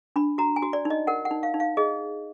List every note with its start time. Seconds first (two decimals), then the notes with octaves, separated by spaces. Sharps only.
0.16 D4 B5
0.38 F#4 A#5
0.56 G#5
0.62 F#4
0.73 D5
0.85 D#4
0.90 D#5
1.07 A#4 F#5
1.25 F#5
1.31 D#4
1.43 F5
1.54 D#4
1.60 F5
1.77 G#4 D#5